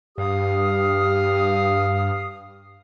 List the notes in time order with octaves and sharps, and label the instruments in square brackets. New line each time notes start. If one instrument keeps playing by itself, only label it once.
[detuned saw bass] G2 [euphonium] G4 [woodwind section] F5 D#6